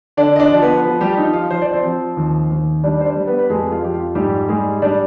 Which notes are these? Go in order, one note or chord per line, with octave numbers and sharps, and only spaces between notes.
D3 D4 D5
D#5
D4 D5
F3
B3 B4
F3 B3 B4
G3 G4
F3 D#4
F4
F3 C5
D5
C4 C5
F3
D#2
D#2
G3 D4 D5
C5
D4 D5
G3
B3 B4
B4
F2 G#3 G#4
F4
F2 G4
F4
G#2 G3 G4
G3 G#3 G#4
G3 D4 D5